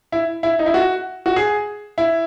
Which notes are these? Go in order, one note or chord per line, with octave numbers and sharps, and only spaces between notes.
E4
E4
D#4
E4
F#4
F#4
G#4
E4